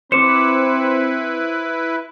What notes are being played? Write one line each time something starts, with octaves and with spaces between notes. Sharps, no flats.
C4 E4 B4 C5 D6 C#7 E7